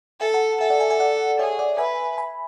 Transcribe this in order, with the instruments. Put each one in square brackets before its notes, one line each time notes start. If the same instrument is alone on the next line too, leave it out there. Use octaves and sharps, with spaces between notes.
[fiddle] A4 [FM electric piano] E5 G#5
[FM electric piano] F#5 A5
[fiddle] A4 [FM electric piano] E5 G#5
[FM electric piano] D5 F#5
E5 G#5
E5 G#5
D5 F#5
[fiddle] G#4 [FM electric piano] C#5 E5
[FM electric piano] D5 F#5
[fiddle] B4 [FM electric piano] E5 G#5
[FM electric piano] G#5 B5